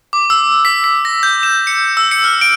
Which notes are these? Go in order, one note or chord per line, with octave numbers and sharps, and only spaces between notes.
D6
E6
B6
B6
A#6
G6
E7
C#7
E6
C#7
F6
D7